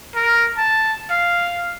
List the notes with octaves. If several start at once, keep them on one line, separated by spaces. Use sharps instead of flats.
A#4
A5
F5